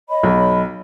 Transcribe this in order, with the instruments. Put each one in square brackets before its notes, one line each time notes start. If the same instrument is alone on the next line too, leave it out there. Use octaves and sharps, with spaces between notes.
[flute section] C#5 D#5 B5
[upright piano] B1